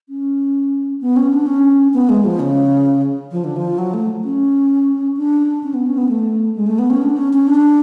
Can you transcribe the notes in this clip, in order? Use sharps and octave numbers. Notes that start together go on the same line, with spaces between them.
C#4
B3
C#4
D4
C#4
B3
G#3
F3
C#3
F3
D3
F3
F#3
A3
C#4
D4
C#4
B3
C#4
B3
A3
G#3
A3
B3
C#4
D4
C#4
C#4
D4